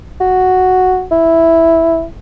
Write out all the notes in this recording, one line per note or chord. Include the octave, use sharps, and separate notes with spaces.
F#4
E4